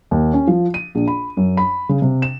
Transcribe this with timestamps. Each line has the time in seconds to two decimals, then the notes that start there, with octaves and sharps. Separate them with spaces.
0.11 D#2
0.34 C#4
0.47 F3
0.74 D#7
0.95 A#1
1.08 B5
1.37 F#2
1.57 B5
1.89 C#3
2.02 C3
2.22 E7